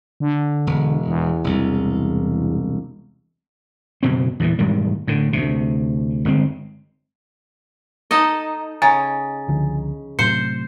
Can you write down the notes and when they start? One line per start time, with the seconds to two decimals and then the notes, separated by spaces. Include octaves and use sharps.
0.20 D3
0.67 E1
1.07 E2
1.44 E1 C2
4.03 F#1 B2 C4
4.40 E2 A#2 E3
4.59 E1 G#2 D#3 G3
5.07 A2 D3
5.33 D2 C3
6.25 G1 G#3 C4
8.11 D#4 A4 D#5
8.82 C#3 G#5 A#5 A6
9.48 C#2 D3 F3
10.19 A2 C3 F#3 C5 C#7